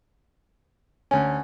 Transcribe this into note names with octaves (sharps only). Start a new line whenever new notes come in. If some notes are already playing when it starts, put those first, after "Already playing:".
D2 C#4 G#5